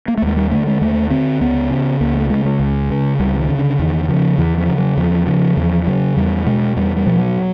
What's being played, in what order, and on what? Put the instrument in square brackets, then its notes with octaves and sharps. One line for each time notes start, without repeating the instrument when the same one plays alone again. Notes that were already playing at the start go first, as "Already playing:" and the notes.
[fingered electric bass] A#3
A3
D#2 G#3
G3
D3 A3
G#3
D#2 A3
D3 C4
C#2 B3
C#3
C#2 A#3
A3
C#3 G#3
G#3
C#2
C#3
C#2 G3
D#3
C#3
D3
E2 D#3
C#3 F3
E2 E3
F3
C#3
F#3
E2 F3
C#3 F3
E2 F3
C#3 F#3
E2 G3
B2 G#3
E2 G3
G3
B2 F3
F#3